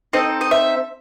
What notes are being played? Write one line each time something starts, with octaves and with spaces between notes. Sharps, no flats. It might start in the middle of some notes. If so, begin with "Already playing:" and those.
C4 D#4 A4 D#5
D#5
E5